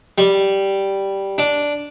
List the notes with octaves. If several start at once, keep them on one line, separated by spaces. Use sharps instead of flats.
G3
D4